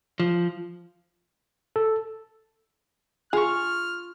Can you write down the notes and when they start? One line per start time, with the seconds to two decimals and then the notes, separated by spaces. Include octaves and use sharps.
0.20 F3
1.76 A4
3.33 F4 G#4 C#6 F6